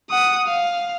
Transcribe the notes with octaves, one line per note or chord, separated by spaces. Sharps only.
F#5 D#6
F5